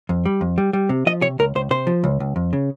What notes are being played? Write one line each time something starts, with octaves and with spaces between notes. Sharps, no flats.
F2
G3
F2
G3
G3
C3
F3 D#5
C3 C#5
C#2 A#4
C#2 C5
C3 C5
F3
C#2
C#2
F2
C#3